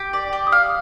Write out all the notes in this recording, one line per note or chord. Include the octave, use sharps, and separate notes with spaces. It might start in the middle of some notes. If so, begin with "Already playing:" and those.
Already playing: G4
D5
G4
D#6
F5 F6